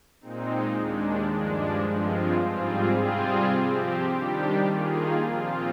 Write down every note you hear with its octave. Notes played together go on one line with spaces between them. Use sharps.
A#2 G#3 C4 D#4
D#2 D#3 G#3 D4
G2 F3 G#3 D4
G2 F3 G#3 C4 F4
G#2 G3 C4 F4 G#4
C3 G3 C4 F4 G#4
F3 C4 G4
D#3 G3 D4 G4
D#3 A#3 F4 G#4
A#2 F3 C4 F4